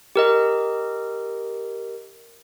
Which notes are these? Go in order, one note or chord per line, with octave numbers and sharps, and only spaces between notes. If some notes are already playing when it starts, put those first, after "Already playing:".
G4 A#4 D#5